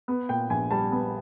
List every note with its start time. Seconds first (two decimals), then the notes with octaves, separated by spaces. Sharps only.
0.08 B3
0.29 A#2 G5
0.50 A#1 G#5
0.71 G3 A5
0.92 B3